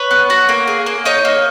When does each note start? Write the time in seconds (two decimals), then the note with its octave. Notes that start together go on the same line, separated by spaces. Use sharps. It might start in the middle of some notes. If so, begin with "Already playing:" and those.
Already playing: B4 C#5
0.11 B3
0.30 F#4
0.49 A#3
0.67 G#4
0.86 A#3
1.05 D#4 C#5 D#5
1.25 A#3